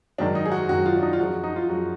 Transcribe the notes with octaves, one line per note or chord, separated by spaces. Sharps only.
G#2 D#3 F#3 D4
D#4
G#4
F#4
G#2 D#3 F#3 F#4
F4
D4
D#4
F4
F#2 F3 G#3 F#4
D#4
F4
F#2 F3 G#3 F#4